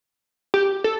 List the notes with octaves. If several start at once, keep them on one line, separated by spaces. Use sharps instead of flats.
G4
A4